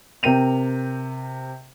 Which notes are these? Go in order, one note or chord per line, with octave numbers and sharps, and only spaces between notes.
C3 A#4 G5 D#7 F7